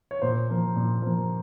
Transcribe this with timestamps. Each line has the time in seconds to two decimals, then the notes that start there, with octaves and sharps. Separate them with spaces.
0.11 C#5
0.22 A#2 C5
0.49 F3 A#3
0.76 A#2
1.02 F3 A#3